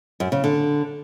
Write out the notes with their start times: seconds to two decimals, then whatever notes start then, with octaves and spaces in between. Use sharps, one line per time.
0.20 F#2
0.32 C#3
0.44 D3